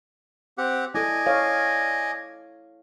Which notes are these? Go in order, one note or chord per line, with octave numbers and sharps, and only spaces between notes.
C4 G4 F#5
E4 A4 D5 D#5 G#5
A4 C#5 F5